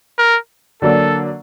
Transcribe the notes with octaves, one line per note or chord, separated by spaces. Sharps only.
A#4
D3 F#3 A#3 D4 A4